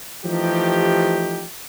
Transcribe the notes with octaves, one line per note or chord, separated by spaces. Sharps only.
E3 F3 A3 D#4 G4